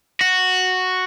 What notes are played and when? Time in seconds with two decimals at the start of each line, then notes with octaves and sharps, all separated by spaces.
0.21 F#4